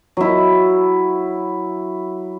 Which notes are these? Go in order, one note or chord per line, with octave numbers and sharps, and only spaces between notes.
F#3 E4